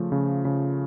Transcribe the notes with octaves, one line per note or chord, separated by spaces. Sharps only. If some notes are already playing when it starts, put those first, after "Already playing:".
Already playing: C#3 F3 A3
C#3
C#3